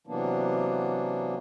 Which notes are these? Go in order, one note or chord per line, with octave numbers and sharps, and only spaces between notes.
C3 E3 F#3 A#3 B3 D4